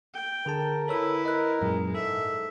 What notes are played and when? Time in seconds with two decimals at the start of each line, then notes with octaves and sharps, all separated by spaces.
0.14 G5
0.46 D3 G#4 A#4 A5
0.88 E4 A4 B4 C#5 E6
1.25 A#4 D#5 F#6
1.61 F#2 A#2 F#3 G#3
1.95 G#2 A4 E5